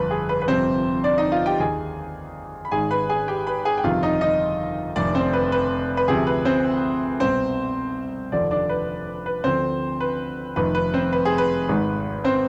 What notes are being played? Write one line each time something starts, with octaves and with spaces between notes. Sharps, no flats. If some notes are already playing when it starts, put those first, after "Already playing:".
Already playing: G1 F2 B4
G#4
B4
B4
G1 F2 C3 C4 C5
D4 D5
D#4 D#5
F4 F5
G4 G5
D#2 D#3 G#4 G#5
B5
G#1 G#2 D#3 G#4 G#5
B4 B5
G#4 G#5
G4 G5
B4 B5
G#4 G#5
G5
G1 F2 C3 D#3 F4 F5
D#4 D#5
D#4 D#5
F1 F2 D#3 D4 D5
C4 C5
B4
B4
B4
D2 C3 F3 G#4
B4
C4 C5
C2 B2 C4 C5
F1 D#2 D3 F3 D4 D5
D4 D5
B4
B4
D2 D3 F3 C4 C5
B4
F1 F2 D#3 B4
B4
C4 C5
B4
G#4
B4
G#1 G#2 D#3
C4 C5